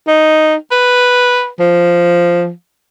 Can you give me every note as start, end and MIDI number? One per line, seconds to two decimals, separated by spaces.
0.07 0.55 63
0.71 1.48 71
1.59 2.50 53